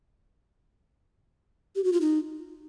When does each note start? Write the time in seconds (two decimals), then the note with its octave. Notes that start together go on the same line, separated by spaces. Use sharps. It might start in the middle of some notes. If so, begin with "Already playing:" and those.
1.76 G4
1.84 F#4
1.93 F4
2.01 D#4